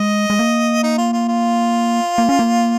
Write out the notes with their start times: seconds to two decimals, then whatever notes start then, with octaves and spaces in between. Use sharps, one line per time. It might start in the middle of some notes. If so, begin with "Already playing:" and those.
Already playing: G#3 D#5
0.30 G#3
0.39 A#3
0.84 D#4
0.98 F4
1.13 F4
1.29 F4
2.18 A#3
2.29 C#4
2.39 A#3